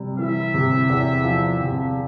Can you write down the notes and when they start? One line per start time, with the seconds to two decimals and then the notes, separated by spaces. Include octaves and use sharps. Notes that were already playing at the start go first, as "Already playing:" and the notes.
Already playing: C3 G3
0.19 E3 E5
0.54 C3
0.90 E2
1.24 F3
1.60 C3